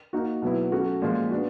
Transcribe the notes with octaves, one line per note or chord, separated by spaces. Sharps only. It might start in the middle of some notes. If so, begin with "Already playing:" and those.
A#3 D#4 F#4
B2 F#3 B3 E4
F#3 A3 C#4 F#4
A#2 F3 G#3
B3 D4 F#4